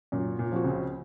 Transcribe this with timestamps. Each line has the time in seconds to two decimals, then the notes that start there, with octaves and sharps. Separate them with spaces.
0.12 F#2 A#2
0.39 A#2
0.52 F3 C4 F#4
0.63 C#2 C#3